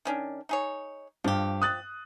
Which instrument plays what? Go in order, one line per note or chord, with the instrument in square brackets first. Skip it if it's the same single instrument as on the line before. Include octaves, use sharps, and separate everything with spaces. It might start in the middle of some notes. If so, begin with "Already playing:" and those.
[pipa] D#3 C#4 D4
D#4 G#4 C#5
[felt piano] G2 [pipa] F3 G4
[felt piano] D#6 F#6 A6